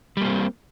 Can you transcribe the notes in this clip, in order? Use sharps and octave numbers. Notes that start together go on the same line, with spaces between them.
G3 A#3 C4